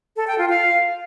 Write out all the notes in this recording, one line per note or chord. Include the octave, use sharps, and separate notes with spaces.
A4
G5
F4
F5